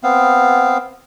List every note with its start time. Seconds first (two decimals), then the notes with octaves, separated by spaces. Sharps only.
0.03 B3 C4 F5